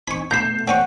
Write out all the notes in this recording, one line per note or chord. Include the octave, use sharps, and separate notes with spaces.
C4 D#4 G#5 B5 C#6
B2 A3 A#5 B5 G6 C7 E7
C4 C#4 F#5 C#6